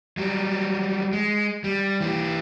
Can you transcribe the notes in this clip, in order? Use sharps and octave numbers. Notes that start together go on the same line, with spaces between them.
F#3 G3
G#3
G3
E3 G4